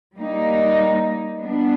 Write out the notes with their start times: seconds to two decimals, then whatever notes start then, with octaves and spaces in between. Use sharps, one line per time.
0.15 G3 A#3 D#4
1.39 G3 B3 D4